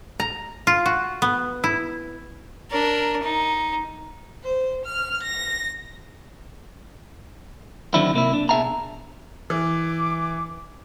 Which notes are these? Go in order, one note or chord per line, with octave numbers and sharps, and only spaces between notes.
A#5
F4
F#4
B3
E4
D4 A#4
D#4
C5
F6
A#6
D3 D#3 F#3 C4 D4 E4
C3 A#3 E4
D4
B2 G#4 E5 F5 A5 A#5
E3 D6